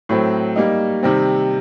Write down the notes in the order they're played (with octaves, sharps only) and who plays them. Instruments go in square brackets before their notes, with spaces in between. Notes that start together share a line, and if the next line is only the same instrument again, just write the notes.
[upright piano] A2 F#3 C4
G3 A#3 D#4
C3 D#3 G3 C4